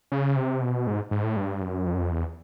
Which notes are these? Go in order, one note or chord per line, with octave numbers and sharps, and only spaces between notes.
C#3
C3
B2
G#2
G#2
A2
G2
F#2
F2
F#2
F2
E2